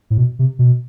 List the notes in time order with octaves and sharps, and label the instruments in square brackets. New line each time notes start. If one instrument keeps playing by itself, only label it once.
[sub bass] A2
B2
C3
B2